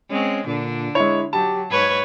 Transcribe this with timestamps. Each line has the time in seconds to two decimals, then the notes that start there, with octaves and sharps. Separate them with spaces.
0.10 G#3 C4 C#4
0.46 A#2 D3 D4
0.95 G#3 E4 C#5
1.33 F#3 G4 A5
1.71 G#2 B4 C#5 G#6